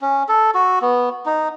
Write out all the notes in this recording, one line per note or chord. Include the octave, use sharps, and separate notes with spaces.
C#4
A4
F#4
B3
D#4